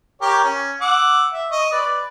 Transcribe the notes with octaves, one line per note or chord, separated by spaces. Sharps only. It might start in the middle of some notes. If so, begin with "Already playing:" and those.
G4 A#4 C#5
C#4
F#5 D6 E6
E5
D#5 C#6
B4 D5